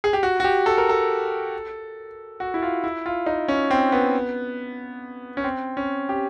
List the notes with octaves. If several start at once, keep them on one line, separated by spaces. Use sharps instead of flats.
G#4
G4
F#4
F#4
G4
A4
A#4
A4
F#4
E4
F4
E4
F4
D#4
C#4
C4
B3
C#4
C4
C#4
G4